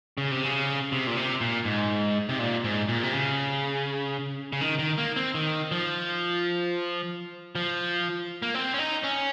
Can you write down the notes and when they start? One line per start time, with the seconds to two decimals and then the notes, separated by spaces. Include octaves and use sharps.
0.18 C#3
0.31 C3
0.44 C#3
0.92 C3
1.07 A#2
1.17 C3
1.41 A#2
1.65 G#2
2.29 C3
2.39 A#2
2.64 G#2
2.88 A#2
3.03 C3
3.13 C#3
4.53 C#3
4.61 D#3
4.79 D#3
4.98 A#3
5.16 C4
5.35 D#3
5.72 F3
7.55 F3
8.42 A#3
8.54 C4
8.74 C#4
8.79 D#4
9.04 C#4